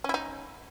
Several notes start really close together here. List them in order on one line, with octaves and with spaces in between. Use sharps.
C#4 E4 D#4